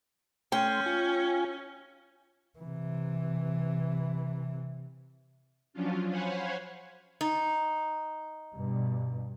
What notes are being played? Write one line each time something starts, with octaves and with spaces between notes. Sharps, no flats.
A3 C#4 G5 C6
F4 G#5
C3 E3
F3 F#3 C#4 D4 F4
C5 C#5 F5 F#5 G#5 B5
D#4
G2 B2